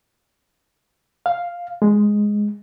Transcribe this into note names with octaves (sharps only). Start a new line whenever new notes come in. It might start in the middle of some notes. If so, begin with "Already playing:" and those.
F5
G#3